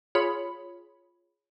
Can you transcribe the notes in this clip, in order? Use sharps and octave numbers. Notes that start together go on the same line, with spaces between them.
F4 G#4 C#5 B5